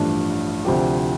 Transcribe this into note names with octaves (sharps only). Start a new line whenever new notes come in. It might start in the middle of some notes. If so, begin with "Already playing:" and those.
Already playing: A1 G2 F3 A3 D4
D2 C3 F3 D4 G4